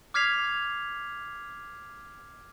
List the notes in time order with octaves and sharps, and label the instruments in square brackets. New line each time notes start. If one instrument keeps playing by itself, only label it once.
[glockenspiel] D6 F6 G#6 B6 C7 F7